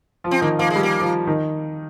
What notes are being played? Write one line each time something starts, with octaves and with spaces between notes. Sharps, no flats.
F3 F4
C4
D#3 A#3 D#4
F3 A#3 F4
G#3
G3 G4
A#3
F3 F4
D#3 D#4